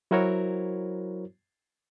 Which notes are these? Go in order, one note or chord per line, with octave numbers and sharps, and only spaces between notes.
F#3 E4 F#4 A#4 C5 C#5